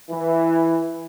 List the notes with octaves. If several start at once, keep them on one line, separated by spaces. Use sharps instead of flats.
E3